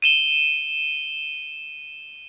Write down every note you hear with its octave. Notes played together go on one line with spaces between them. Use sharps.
D#7 E7 G7